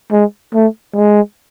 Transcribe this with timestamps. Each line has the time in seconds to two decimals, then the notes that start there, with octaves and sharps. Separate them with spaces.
0.12 G#3
0.54 A3
0.95 G#3